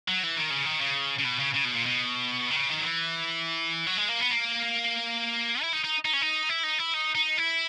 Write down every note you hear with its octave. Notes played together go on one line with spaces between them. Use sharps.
F#3
E3
D#3
C#3
D#3
C#3
C#3
B2
C#3
C#3
B2
A#2
B2
D#3
C#3
D#3
F#3
E3
F#3
G#3
A#3
B3
A#3
E4
D#4
D#4
D#4
C#4
D#4
E4
D#4
E4
D#4
D#4
E4